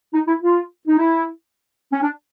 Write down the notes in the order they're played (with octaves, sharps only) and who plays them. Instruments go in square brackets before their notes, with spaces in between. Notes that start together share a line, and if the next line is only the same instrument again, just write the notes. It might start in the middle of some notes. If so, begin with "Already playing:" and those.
[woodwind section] D#4
E4
F4
D#4
E4
C#4
D4